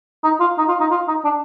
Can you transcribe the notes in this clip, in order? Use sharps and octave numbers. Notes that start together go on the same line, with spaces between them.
D#4
F4
D#4
F4
D#4
F4
D#4
D4